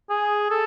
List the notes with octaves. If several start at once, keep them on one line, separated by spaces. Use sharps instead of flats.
G#4
A4